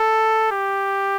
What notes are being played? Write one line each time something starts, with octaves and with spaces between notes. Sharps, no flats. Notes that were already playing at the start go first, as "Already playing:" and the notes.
Already playing: A4
G4